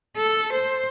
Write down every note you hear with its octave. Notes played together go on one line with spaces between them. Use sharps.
A4
C5